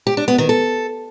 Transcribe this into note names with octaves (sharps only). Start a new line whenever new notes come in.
G4
D4
B3
D#3
A4